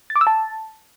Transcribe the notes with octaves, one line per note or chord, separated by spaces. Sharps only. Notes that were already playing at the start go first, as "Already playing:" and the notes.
A6
D6
E6
A5